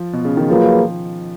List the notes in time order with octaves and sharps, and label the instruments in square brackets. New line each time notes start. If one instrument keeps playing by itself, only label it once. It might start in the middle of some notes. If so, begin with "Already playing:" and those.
Already playing: [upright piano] F3
B2
C#3
D#3
[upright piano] F3 [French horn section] F#3 A#3 F4 G#4 B4